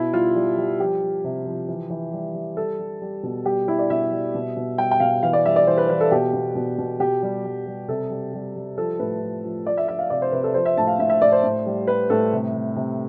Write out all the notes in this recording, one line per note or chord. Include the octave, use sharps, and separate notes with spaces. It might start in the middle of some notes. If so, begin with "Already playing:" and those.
Already playing: B2 E4
G3 F4
G3
G3
F3 G4
F3
C3
F3
E3
E3
G3
G3
G3 A4
G3
G3
B2
G3 G4
G3 E4
D5
B2 E5
G3
B2
B2
G3 G5
G5
B2 F5
E3 F5
D5
G3 E5
D5
E3 C5
B4
E3 B4
A4
B2 G4
B2
B2
B2
B2 G4
G3
G3
G3
C3 A4
G3
G3
G3
F3 A4
A2 B4
F3
F3
F3 D5
E5
F3 E5
F5
C3 D5
C5
C3 B4
A4
F3 C5
E5
A2 A5
F5
A2 E5
E5
A2 D5
C5
A2
G3
G3 B4
A2 A4
C3
C3
C3